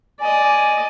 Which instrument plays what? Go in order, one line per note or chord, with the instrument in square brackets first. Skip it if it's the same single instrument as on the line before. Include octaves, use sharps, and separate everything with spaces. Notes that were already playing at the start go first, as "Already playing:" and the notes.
[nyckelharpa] D5 D#5 [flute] G#5